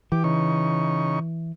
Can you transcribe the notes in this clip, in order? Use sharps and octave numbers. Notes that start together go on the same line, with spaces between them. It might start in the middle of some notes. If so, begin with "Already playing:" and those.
E3 G4 D6
C#3 D#4 C#6